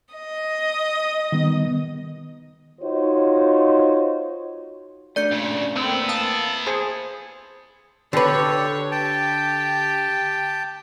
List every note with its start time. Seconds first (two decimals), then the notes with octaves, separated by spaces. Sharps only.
0.14 D#5
1.32 D#3 G3 B3
2.81 D#4 F4 F#4 C5 C#5
5.16 A3 D4 D5 G6 C#7
5.31 A#2 C#3
5.76 B3 C4 E4
5.87 A#3
6.09 F5 A5 D#6
6.67 G#4 C5 G#5
8.13 D3 G4 A4 B4 C#5
8.92 G4 G5 A5